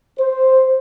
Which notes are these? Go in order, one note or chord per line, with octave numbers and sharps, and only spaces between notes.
C5